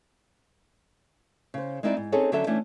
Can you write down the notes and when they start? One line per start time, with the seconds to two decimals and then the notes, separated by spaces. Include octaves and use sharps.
1.54 C#3 C5
1.83 G#3 C4 D#4 E4 C#5 D5
1.97 G#2
2.12 C4 C#4 D#4 G#4 A4 C#5
2.32 D3 F#3 C#4 A4 E5
2.47 E3 A3 C#4 D4